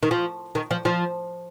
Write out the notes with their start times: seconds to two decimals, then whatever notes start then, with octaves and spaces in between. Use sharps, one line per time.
0.03 D#3
0.11 F3
0.55 D#3
0.71 F3
0.85 F3